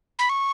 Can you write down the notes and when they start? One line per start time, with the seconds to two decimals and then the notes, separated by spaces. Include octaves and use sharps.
0.19 B5
0.29 C#6